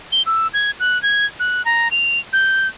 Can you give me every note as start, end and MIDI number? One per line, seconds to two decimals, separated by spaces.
0.12 0.22 103
0.26 0.47 88
0.54 0.71 92
0.80 1.01 90
1.03 1.26 92
1.40 1.64 90
1.65 1.91 82
1.91 2.19 101
2.33 2.68 91